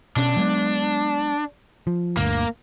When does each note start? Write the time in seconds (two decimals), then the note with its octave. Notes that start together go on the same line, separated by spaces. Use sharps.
0.16 B2 C#4 D4
0.36 F#3 G#3 B3
1.87 F3
2.17 G1 D2 A#3